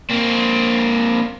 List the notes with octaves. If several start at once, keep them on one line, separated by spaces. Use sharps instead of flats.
A#3 C4